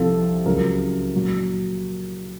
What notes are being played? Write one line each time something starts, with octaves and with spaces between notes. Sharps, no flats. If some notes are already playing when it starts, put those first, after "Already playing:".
Already playing: C2 C3 F3 A4
C#2 C#3 F#3 A#4
A#2 F#3